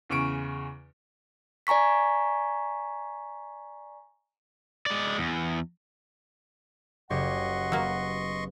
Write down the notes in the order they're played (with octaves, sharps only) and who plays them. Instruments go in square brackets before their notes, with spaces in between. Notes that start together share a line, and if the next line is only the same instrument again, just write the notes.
[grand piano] E2 C#3 C#6 D7
[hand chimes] D5 G#5 A#5 C#6 B6
[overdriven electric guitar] G#3 D5
E2
[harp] F#1 G4 C#5 [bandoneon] D#5 C6 C#6 [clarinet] F#5
[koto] F#3 A#3 [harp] B3